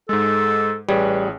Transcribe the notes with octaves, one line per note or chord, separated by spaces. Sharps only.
G#2 G#3 A4
A1 G3 G#4 B4 C#5